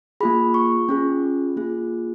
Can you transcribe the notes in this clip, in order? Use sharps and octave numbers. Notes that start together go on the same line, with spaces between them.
A#3 F4 G#4 B5
C#6
C#4 F4 G#4
A#3 F4 G#4